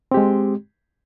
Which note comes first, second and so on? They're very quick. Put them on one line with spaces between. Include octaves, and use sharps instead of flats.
C4 G4 G#3